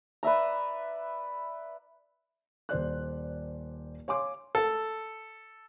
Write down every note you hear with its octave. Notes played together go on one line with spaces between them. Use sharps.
B4 D5 E5 A#5
D#1 C5 D5 F#6
C#5 F5 G#5 C6 D6
A4